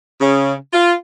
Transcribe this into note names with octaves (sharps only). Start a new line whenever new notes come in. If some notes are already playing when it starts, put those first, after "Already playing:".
C#3
F4